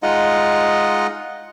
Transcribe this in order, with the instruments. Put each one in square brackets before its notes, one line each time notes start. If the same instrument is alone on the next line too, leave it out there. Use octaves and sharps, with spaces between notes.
[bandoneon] G#3 D#4 F4 D#5 F#5